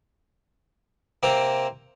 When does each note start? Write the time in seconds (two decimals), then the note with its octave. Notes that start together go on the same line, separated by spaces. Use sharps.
1.23 C3 A#3 C4 A#5